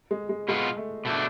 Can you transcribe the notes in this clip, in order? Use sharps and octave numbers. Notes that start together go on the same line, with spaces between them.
G#3
G#3
B2 G#3 B3 F4
A3
B2 A3 D4